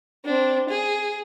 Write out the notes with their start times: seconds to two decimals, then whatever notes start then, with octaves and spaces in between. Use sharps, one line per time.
0.25 C4 D4
0.69 G#4